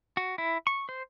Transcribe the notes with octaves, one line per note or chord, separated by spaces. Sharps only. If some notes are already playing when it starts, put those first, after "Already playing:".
F#4
E4
C#6
C5